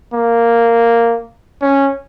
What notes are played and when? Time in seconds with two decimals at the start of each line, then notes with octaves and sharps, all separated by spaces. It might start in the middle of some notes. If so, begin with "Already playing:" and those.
0.13 A#3
1.62 C#4